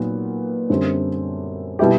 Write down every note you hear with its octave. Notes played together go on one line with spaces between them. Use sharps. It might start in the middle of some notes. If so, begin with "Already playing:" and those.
Already playing: A#2 F#3 B3 D#4
F#2 D3 G3 C4
B2 G3 B3 E4 G4